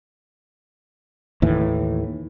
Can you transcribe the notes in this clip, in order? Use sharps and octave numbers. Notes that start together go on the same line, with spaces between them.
D#2 A2 E3